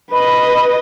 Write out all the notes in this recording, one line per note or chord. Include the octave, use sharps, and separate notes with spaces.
B4 D#5 B5